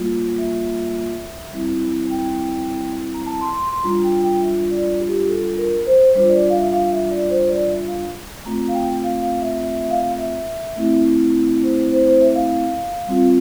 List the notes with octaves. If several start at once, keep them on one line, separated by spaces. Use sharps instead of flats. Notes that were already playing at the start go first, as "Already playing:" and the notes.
Already playing: G3 A#3 F4
E5
G3 C4 E4
G5
A#5
A5
C6
C6
C6
G3 D4 F4 A#5
G5
G5
E5
D5
G4
A4
A#4
C5
G3 D4 F4 C5
D5
F5
E5
F5
E5
D5
C5
D5
E5
F5
A3 C4 F4 A#5
F5
G5
F5
F5
E5
E5
E5
F5
E5
A3 C4 E4
C5
C5
C5
E5
F5
G3 C4 F4